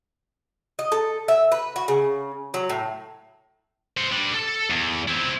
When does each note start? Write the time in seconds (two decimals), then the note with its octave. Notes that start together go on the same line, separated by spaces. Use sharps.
0.79 D#5
0.92 A4
1.28 E5
1.52 B4
1.76 F#4
1.88 C#3
2.54 F#3
2.69 A2
3.97 C5 F#5
4.11 G3 D4
4.33 A4
4.70 E2
5.08 C4 E4